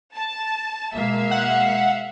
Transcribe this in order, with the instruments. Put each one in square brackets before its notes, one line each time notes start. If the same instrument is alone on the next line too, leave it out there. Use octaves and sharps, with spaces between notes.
[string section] A5
[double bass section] B2 G#3 A#3 [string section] E5 F5
[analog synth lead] F#5